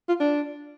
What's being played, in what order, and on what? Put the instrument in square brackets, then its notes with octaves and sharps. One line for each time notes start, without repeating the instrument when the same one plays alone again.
[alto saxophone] F4
D4